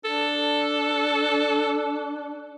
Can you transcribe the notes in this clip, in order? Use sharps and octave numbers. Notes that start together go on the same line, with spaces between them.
D4 A4